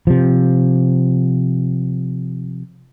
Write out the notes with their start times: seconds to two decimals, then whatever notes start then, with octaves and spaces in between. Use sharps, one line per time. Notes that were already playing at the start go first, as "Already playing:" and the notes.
0.07 C3 F3